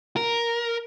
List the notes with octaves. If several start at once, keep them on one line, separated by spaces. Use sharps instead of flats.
A#4